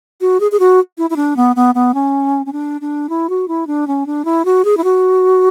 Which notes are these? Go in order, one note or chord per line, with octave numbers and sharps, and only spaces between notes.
F#4
G#4
G#4
F#4
E4
E4
D4
B3
B3
B3
C#4
C#4
D4
D4
E4
F#4
E4
D4
C#4
D4
E4
F#4
G#4
E4
F#4